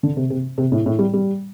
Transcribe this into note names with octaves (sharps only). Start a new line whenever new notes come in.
D3
C3
C3
C3
A2
A2
G3
G3